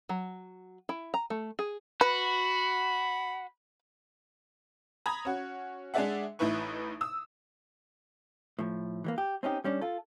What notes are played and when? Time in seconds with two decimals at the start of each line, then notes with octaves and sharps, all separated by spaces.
0.09 F#3
0.89 E4
1.14 A#5
1.30 A3
1.59 G#4
2.01 F#4 B4 B5
5.06 A#5 B5 D#6 G#6
5.25 C#4 F#4
5.94 G#3 D4 G#4 D5 E5 F#5
6.39 A1 A2 D#4 E4 B4 C#6
7.01 D#6 E6
8.59 A2 F3
9.04 E3 G3 A#3
9.18 G4
9.43 C4 C#4 D#4 G4
9.64 G3 C#4 D4
9.81 F4 A4